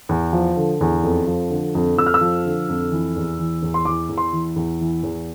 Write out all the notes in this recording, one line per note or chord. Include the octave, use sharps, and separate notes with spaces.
E2
F3
D3
E2
F2
F3
D3
F2
F2 E6
F6
E6
F3
D3
F2
E3
E2
E3
E2
C6
E3 D6
E2
C6
E3
E2
E3
E2